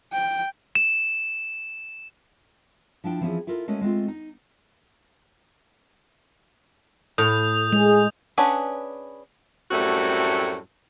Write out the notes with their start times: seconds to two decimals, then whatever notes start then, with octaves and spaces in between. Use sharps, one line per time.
0.13 G5
0.75 E7
3.04 F3 D4 E4 G5
3.21 E3 F3 C4 C#4 E4 G#4
3.47 E4 F4 A4 A#4
3.68 G#3 A3 C#4 F#4 A#4 D#5
3.81 G#3 A3 C4 F4
4.08 D#4
7.18 A2 D#6 G6 F7
7.73 G#3 G#4 F7
8.38 C#4 D4 G#4 B4 F#5
9.71 F#2 A2 G3 A3 C4 F#4